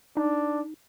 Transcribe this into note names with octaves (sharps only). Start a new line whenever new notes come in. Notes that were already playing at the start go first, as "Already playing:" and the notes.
D4 D#4